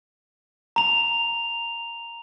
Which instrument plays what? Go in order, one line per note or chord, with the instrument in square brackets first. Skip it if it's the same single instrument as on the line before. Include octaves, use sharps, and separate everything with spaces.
[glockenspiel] A#5 F7